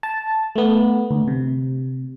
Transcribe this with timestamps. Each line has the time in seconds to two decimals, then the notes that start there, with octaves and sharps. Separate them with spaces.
0.03 A5
0.56 A3 B3
1.11 D2
1.28 C3